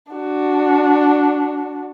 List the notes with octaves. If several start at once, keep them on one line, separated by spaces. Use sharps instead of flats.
D4 F#4